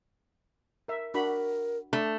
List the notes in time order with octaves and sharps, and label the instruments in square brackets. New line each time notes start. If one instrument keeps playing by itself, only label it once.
[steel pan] A#4 E5
[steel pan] D4 F#4 B5 [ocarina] A#4
[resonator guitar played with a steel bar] A3 [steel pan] D4